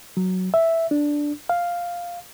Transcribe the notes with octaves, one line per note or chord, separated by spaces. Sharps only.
F#3
E5
D4
F5